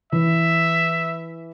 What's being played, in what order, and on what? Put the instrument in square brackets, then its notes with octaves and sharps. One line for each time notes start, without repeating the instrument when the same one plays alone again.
[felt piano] E3 [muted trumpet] E5